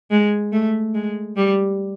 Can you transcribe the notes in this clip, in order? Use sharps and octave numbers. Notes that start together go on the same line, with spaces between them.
G#3
A3
G#3
G3